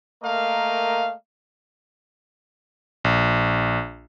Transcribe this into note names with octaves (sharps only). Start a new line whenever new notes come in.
A3 A#3 A#4 D#5 F5
A#1